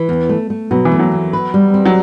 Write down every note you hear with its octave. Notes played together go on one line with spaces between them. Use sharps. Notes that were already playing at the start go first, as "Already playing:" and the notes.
Already playing: E3
E2
A3
A3
B2 F#3
E3
A3
F#3
E2
B4
G3
C4
F#3